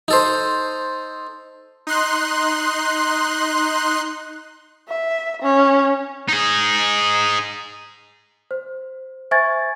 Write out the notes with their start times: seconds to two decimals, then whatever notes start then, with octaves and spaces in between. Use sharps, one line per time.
0.08 D#4 A4 C5
1.87 D#4 C6 F#6
4.89 E5
5.42 C#4
6.28 D#4 G#4
8.51 C5
9.31 C5 E5 G#5 C#6 G#6 A6